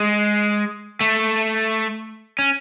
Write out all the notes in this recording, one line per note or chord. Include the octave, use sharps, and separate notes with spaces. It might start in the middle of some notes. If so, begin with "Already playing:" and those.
Already playing: G#3
A3
C#4